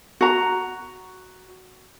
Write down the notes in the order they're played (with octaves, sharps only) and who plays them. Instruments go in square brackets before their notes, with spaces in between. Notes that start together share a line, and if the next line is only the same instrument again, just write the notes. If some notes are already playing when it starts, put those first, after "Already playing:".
[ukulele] F#4 A#5